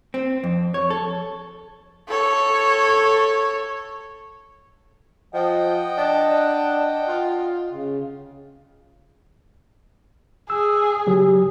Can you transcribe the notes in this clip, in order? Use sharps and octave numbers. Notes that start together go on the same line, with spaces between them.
C4
F2
C#5
A4
A4 C#5
F3 D#5 F#5 G5
D4
F4
C#3
G#4 E6
C#3 F#3 G4